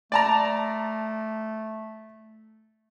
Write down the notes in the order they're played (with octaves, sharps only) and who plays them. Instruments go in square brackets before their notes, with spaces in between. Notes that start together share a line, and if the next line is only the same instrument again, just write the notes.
[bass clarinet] A3 [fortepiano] D5 A5 A#5